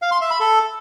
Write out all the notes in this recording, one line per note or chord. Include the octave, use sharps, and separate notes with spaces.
F5
C6
E5
B5
A4